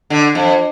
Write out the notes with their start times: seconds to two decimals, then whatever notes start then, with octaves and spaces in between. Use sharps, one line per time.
0.10 D3
0.35 F2